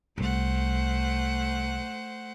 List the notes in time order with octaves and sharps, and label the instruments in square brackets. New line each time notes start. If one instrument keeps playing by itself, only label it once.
[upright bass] C2 [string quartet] A3 C5 F#5